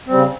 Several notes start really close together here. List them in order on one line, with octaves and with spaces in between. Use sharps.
C4 G3 C#3